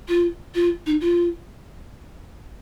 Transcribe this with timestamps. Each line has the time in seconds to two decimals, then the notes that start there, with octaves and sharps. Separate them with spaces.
0.09 F4
0.55 F4
0.86 D#4
1.01 F4